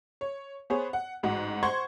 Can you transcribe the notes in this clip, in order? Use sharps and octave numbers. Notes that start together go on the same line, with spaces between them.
C#5
B3 G#4 C5 C#5
F#5
A1 G#2 F#4
C5 F#5 C6 C#6 G#6